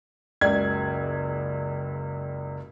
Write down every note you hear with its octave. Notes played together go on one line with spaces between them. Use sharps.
F#1 C#2 D5 G#6